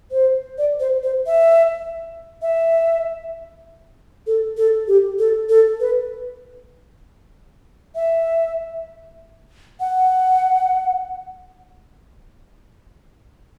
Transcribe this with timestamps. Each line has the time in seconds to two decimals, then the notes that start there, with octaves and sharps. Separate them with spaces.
0.11 C5
0.58 D5
0.80 C5
1.03 C5
1.27 E5
2.42 E5
4.27 A4
4.57 A4
4.88 G4
5.19 A4
5.49 A4
5.80 B4
7.95 E5
9.80 F#5